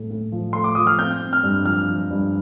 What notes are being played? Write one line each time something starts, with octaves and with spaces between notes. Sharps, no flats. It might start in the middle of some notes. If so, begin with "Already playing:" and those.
Already playing: A2 A3
A2
F3
A3 C6
D6
F3 D#6
F6
C4 G6
C4
F6
G2
F3 F6
F3
G2